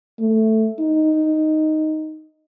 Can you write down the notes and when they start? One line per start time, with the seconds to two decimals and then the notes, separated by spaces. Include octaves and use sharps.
0.20 A3
0.80 D#4